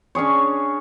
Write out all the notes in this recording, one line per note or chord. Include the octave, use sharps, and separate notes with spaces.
C#4 D4 G#4 C#5